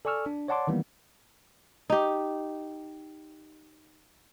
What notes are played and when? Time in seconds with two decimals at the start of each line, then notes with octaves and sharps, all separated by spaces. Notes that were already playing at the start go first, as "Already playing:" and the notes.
0.05 A4 D5 G#5 C#6 E6 F6
0.26 D4
0.48 C#5 D5 F#5 A5 C6 D6
0.67 D#3 E3 G3 A#3 B3
1.90 D#4 G4